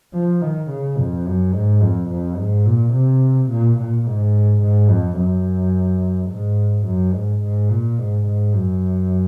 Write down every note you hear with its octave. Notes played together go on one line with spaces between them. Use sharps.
F3
D#3
C#3
F2
F#2
G#2
F2
F2
G#2
A#2
C3
A#2
A#2
G#2
G#2
F2
F#2
G#2
F#2
G#2
G#2
A#2
G#2
G#2
F#2